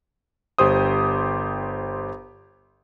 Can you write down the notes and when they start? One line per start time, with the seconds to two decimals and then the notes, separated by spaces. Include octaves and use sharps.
0.58 G1 G4 C5 D#6